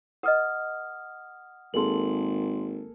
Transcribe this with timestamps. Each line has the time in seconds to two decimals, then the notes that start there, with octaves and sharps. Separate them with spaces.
0.23 A#4 D#5 F#5 D#6 F6
1.74 G#1 A#3 G#4 A4 C6 F#7